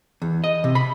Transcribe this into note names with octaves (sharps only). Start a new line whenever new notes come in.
E2
D#5
C3
B5